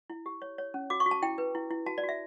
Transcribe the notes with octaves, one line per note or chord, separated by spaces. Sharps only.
E4
G4
C#5
C#5
C#4
F#4 D6
C#6
F#4
A5
E4 G5
B4
E4
E4
F#4 A5
D5
F#4
E5